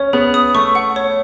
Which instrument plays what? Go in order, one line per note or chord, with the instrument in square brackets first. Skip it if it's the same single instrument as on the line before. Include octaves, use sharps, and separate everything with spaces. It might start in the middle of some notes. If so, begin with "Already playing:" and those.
Already playing: [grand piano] C#4 [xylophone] C#5
[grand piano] B3 [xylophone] G#4
[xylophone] D#6
[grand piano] A3 [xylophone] C#6
[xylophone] F#5
C#5